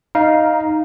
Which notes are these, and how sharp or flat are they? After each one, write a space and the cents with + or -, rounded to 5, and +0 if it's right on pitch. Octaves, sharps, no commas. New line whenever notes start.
D#4 +0 F5 +0 A#5 +20